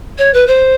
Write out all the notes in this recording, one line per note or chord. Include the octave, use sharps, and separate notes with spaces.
C#5
B4
C5